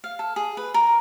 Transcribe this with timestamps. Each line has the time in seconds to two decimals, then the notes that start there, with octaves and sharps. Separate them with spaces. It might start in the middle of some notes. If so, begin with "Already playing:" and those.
0.04 F5
0.19 A4
0.36 G#4
0.57 B4
0.74 A#4